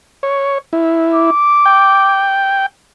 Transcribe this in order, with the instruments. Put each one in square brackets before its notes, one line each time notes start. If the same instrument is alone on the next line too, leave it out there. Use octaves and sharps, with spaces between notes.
[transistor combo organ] C#5
E4
[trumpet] D6
[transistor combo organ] G5